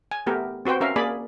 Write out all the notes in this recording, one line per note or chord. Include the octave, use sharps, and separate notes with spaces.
G#5
A3 B3 G4 A#4
C4 F#4 B4 C5 G5
C#4 A#4 E5 F5
A#3 G#4 D5 G#5 B5